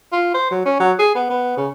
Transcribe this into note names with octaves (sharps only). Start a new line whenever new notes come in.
F4
C5
F#3
C#4
F#3
G#4
B3
B3
C#3